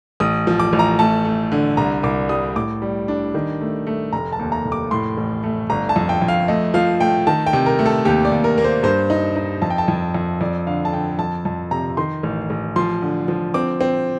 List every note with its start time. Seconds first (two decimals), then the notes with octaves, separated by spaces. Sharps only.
0.20 A1 D#6
0.47 F3
0.60 D6
0.73 A1
0.79 A#5
0.99 A3 A5
1.25 A3
1.52 D3
1.77 C2 A#5
2.03 C2 D6
2.29 G3 D#6
2.56 A2 D6
2.82 G3
3.08 D4
3.34 D#3
3.61 A3
3.87 A3
4.13 F1 A#5
4.33 A5
4.39 D#2
4.52 A#5
4.65 F1
4.72 D6
4.91 A2 C6
5.17 A1
5.43 A3
5.70 G1 A#5
5.89 A5
5.96 F2
6.09 G5
6.22 F2
6.28 F5
6.48 A3 D#5
6.74 F3 F5
7.00 A3 G5
7.27 D#3 A5
7.47 G5
7.53 C3
7.66 A#4
7.79 A3
7.86 A4
8.05 D#2 G4
8.25 D5
8.32 D#2
8.44 A#4
8.58 A#3
8.64 C5
8.83 G2 C5
9.10 D#4
9.36 D#4
9.62 F2 A5
9.70 G5
9.78 A5
9.88 F2
10.14 F2
10.41 F2 D5
10.67 D3 F5
10.85 A5
10.93 D3 G5
11.19 F2 A5
11.45 F2 A5
11.71 C3 A#5
11.97 D#3 C6
12.23 A1
12.50 A1
12.76 F3 C6
13.02 D3
13.28 F3
13.54 C4 D6
13.81 C4